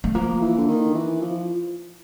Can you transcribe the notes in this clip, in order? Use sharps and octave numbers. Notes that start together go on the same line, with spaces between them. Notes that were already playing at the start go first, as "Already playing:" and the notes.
A3
F3 A#3
E3
D3
D#3
E3
F3